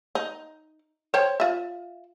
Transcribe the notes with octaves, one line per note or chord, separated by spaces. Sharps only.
D#4
C5 C#5 G5
F4 E5